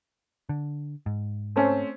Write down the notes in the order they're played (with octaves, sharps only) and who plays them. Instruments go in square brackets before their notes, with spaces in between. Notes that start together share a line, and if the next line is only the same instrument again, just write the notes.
[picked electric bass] D3
G#2
[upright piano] A3 C4 C#4